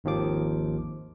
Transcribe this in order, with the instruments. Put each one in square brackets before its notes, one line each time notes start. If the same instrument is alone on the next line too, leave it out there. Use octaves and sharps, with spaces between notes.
[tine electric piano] G#1 D#2 D#3 F3 D6